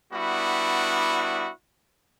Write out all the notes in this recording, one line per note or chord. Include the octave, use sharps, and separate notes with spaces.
G3 B3 D4 E4 F#4